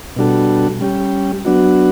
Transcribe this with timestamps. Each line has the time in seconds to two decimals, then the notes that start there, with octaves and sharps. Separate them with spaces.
0.16 B2 G3 D4 F#4 A4
0.81 G3 C#4 G4
1.45 F#3 B3 D4 F#4